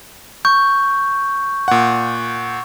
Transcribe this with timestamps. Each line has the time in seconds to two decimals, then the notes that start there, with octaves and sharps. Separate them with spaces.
0.45 C#6 G6
1.68 A#2 F#5